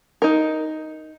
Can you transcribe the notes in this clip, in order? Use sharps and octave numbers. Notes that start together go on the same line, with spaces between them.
D#4 A#4